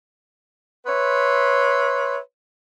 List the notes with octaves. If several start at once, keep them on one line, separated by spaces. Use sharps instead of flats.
B4 C#5 E5 C6